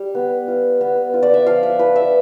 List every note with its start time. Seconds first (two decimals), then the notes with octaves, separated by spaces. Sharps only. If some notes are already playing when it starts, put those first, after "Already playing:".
Already playing: G3
0.15 B3
0.48 F4
0.81 B3
1.14 F4
1.23 D5
1.34 E5
1.46 F3 F5
1.63 E5
1.79 F3 B4
1.96 E5